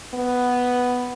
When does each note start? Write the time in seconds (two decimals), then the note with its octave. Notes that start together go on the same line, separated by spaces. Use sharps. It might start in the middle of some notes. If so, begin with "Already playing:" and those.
0.14 B3